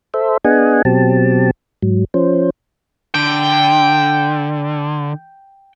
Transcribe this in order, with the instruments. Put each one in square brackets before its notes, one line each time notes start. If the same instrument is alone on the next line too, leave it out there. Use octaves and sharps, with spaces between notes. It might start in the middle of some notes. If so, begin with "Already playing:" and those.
[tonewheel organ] A4 C5 E5
B3 D4 G#4 D#5 F#5 G#5
B2 F#3 C4 G4 A5
G#2 F#3
F3 C#4 C5
[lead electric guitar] D3 [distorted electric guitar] G5